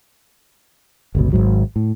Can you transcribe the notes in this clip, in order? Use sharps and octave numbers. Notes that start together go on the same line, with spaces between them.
G1 C#2 B2
G#1 E2 G#2 F#3
A2